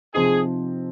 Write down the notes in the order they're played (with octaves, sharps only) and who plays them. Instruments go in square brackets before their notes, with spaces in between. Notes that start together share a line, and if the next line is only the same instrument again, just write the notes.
[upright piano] C3 F3 C4 D#4 [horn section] G#4